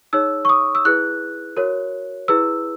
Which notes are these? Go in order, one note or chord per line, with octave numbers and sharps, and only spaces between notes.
D#4 G#4 C#5 E6
C#6
D#6
E6
E4 G#4 B4 F#6
F#4 A#4 C#5
E4 G#4 B4 E6